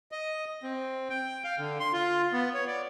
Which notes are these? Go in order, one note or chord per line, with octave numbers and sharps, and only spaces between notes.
D#5
C4
G5
F5
D3
C6
F4
B3
C#5
D5